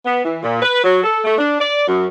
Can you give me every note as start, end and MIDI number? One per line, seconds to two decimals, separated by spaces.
0.06 0.24 59
0.24 0.41 52
0.44 0.60 46
0.63 0.81 71
0.84 0.99 54
1.04 1.20 69
1.25 1.35 57
1.39 1.56 62
1.60 1.87 74
1.87 2.07 42